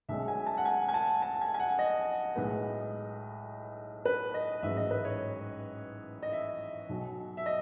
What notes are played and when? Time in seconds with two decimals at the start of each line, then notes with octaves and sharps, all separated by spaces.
0.09 B1 B2 G#3 C#4 E5
0.28 G#5
0.46 A5
0.57 F#5
0.65 G#5
0.88 G#5
0.94 A5
1.22 A5
1.41 G#5
1.54 G#5
1.60 F#5
1.79 D#5
2.35 B1 A2 G#3 B3
4.05 B4
4.34 D#5
4.62 A1 G#2 F#3 E5
4.77 D#5
4.91 B4
5.05 C#5
6.22 D#5
6.32 E5
6.89 B1 B2 F#3
7.37 E5
7.46 D#5